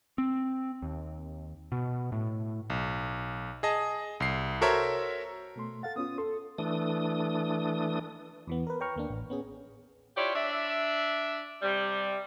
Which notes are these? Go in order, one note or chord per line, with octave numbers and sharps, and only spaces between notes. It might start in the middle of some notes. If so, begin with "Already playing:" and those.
C4
D#2
B2
A2
B1
G#4 D#5 A5
C2 C7
F#4 A4 A#4 C5 C#5 E5
B2 A3 C6
A4 F5 F#5 A6
B3 C#4 F4 D#6
A4 C6
E3 A3 D4 D#6
E2 E3 B3
A#4 B4
B4 C#5 G5 A#5 C#6 F6
D#2 A#3 D4
A1
B3 C#4 G#4
E4 F4 G4 C#5 D5
D4 D5 E5
C3 G3